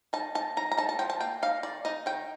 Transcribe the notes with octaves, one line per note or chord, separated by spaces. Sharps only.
D#4 A5
D#4 A5
D#4 A#5
A#5
D#4 A5
A5
F3 G5
A5
A#3 G5
D#4 F5
D#3 D5
D#4 D#5
D#3 G5